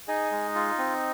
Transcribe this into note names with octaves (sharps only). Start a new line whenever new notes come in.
D#4 G#4 D#5
G#3
F4
C4